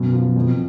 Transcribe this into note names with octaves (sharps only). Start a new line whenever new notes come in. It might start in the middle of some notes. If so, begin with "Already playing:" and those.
Already playing: F#2 B2
F3
F2